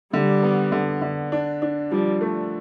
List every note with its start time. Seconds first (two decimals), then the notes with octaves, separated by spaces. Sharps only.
0.13 D3 G3
0.43 B3
0.72 D3
1.02 D3
1.32 D4
1.62 D4
1.91 F3 G3
2.21 A3